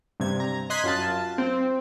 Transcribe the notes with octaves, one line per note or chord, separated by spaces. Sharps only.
G2 C3 G#6
A#5
D#5 C6 F#6 G#6 B6
F#2 F4 A5
C4